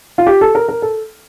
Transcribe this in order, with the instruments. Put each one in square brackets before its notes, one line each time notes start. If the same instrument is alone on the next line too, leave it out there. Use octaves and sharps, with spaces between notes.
[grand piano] F4
G4
A4
A#4
A#4
A4